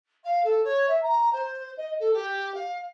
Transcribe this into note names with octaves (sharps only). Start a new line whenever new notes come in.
F5
A4
C#5
E5
A#5
C5
D#5
A4
G4
F5